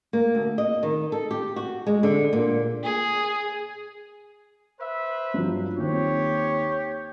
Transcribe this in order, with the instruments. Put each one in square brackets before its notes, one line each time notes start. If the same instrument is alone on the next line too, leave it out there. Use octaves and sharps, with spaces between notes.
[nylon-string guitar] A#3
D2
D#5
D#3
A4
G4
F#4
G#3
D3
A#2
[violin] G#4
[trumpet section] B4 C5 E5
[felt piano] G2 F3 F#3
[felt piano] D#2 C4 [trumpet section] G4 C#5